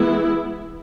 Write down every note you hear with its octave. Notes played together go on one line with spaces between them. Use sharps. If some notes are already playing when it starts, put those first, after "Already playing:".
Already playing: E3 G#3 B3 E4